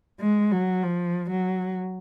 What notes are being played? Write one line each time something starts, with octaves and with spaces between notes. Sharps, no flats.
G#3
F#3
F3
F#3